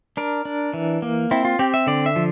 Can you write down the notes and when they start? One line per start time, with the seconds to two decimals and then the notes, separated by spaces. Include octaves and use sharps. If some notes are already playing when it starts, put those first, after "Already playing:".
0.17 D4 A#4
0.45 D4
0.74 E3
1.02 A#3
1.31 C4 E4
1.45 F4
1.59 C4 G4
1.74 E5
1.87 D3 D5
2.06 E5
2.16 F3